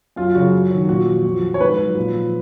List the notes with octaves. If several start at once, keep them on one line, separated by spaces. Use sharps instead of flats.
F#2 F4
C#3 F#3 F#4
F#2
D#3 F#3
A#2 F#4
F3
F2
F3
C#5
G#2 B4
F#3
A#2
F3